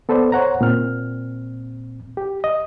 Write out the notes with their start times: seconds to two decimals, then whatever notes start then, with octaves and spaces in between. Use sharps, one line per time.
0.09 B3 A4 B4 C5 D5
0.32 C5 C#5 F#5 A#5
0.61 A#2 C4 F6
2.17 G4
2.44 D#5